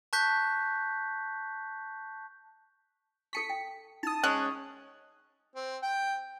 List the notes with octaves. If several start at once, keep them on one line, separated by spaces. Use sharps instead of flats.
A5 C#6 F#6 G6 B6
A4 A5 C#6 B6 C#7
G5
D#4 A5 D#6
G#3 C#4 F#6
C4
G5